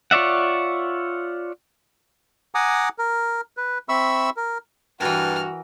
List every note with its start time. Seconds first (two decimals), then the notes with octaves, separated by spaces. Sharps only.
0.11 F4 C#5 D5 E5 F#5
2.55 F#5 G#5 A#5 D6 D#6
2.98 A#4
3.57 B4
3.89 C4 E5 B5 C#6 E6
4.37 A#4
5.00 G2 E3 F#4 A#4 F6